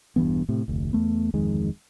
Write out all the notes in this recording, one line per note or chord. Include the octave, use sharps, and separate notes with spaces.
E1 G2 E3 B3
A2 C3
F1 D2
E2 A3 B3
D1 F2 D#3 G#3